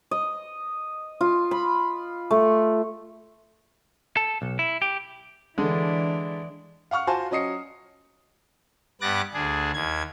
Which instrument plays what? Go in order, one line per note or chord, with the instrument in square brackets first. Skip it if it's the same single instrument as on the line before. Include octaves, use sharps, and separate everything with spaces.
[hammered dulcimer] D#5
F4
B5
A3
[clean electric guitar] A4
B1
E4
G4
[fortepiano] D3 G#3 [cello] E3 D4
[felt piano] F5 F#5 C#6 F6
F4 F#4 C5 G#5 A5
F#3 C#4 D#5 D#6 C7 C#7
[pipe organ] G2 B3 D6 F#6 A6 A#6
D2 D4 G#4
D#2 G#6